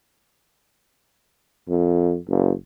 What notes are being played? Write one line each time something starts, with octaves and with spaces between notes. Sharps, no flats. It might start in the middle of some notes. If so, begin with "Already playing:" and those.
F2
F#1